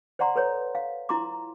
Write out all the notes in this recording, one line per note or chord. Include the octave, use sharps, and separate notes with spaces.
C5 D5 F#5 A#5 C6
A4 B4 C#5
F5
E4 F4 A#5 C6 D6